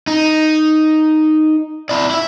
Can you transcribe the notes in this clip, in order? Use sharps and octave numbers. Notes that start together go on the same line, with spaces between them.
D#4
E4 D5
E4 E5